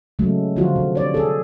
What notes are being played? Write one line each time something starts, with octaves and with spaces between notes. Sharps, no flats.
C#3 F#3 G#3 A3
D3 F3 F#3 F4 F#4
C3
C#5 D5
G#4 A4